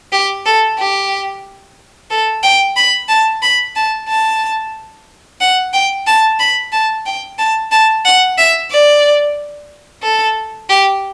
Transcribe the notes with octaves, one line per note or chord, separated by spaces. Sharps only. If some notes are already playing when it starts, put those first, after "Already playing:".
G4
A4
G4
A4
G5
B5
A5
B5
A5
A5
F#5
G5
A5
B5
A5
G5
A5
A5
F#5
E5
D5
A4
G4